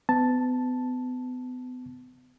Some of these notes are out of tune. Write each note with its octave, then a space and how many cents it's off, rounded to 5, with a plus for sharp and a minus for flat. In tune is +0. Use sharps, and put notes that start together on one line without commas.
B3 +35 A5 +0